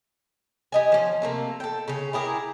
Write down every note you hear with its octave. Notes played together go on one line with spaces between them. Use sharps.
G4 D#5 G#5
F3 C#4
C3 A3 A#3
A4 G5
C#3 C#4
E4 G4 G#4 A#4